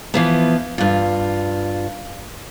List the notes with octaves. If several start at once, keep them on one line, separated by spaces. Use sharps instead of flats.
E3 F3 B3
G2 F4